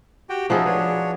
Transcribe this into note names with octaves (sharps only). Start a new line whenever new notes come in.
F#4 G4 G5
F3 C#4 D#4 E4 F#4 G#4
D4 B4 C#5